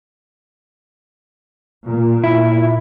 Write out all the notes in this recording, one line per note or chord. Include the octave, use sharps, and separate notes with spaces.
A#2
E4